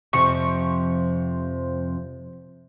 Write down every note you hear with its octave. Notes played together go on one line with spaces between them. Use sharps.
F2 C3 F3 C#6